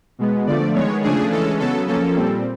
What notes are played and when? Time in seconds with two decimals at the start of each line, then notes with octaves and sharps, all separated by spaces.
0.19 B2 G#3 B3
0.47 D3 F3 A3 D5
0.75 D#3 G#3 B3 C#5
1.03 C#3 F3 A3 D4 G#4
1.31 E3 G#3 C#4 A4
1.60 C#3 F#3 B3 A4
1.87 F3 A#3 C#4 A4
2.16 A#2 G3 C4